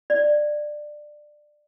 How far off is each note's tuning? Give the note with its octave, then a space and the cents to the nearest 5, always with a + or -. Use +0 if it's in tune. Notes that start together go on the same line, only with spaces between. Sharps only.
D5 +20